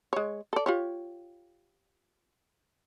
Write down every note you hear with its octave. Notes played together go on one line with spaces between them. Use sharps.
G#3 C#5
A4 D5
F4 G4 C#5